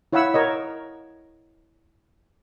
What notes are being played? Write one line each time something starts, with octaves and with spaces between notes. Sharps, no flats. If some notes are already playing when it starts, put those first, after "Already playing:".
E4 C#5 F5 F#5 B5 E6
A#4 C#5 D#5